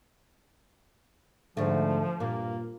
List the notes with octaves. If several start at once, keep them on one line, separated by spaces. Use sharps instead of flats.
G#2 D3 F3 A3
G2 A#2 A#3